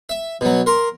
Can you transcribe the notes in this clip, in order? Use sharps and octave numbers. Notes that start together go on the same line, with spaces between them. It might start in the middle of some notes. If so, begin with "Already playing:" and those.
E5
B2 F#3
A#4 C6